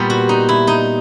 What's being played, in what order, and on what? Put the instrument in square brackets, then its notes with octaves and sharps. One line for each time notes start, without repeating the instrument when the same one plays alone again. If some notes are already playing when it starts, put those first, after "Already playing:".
Already playing: [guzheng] A#2 G3 B3
F#4
D#4
E4
D#4